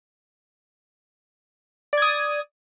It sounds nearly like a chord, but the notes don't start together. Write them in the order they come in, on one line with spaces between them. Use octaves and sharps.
D5 G#6 D#6